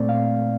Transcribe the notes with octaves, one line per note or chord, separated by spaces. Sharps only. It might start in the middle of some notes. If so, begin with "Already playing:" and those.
Already playing: A#2 A3 C4 D5
F5